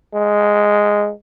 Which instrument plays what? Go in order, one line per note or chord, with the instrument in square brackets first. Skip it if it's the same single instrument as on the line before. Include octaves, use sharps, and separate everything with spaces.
[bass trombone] G#3